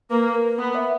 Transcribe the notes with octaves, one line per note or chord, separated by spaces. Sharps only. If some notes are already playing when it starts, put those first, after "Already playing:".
A#3 B4
A#4
B3 B4
E5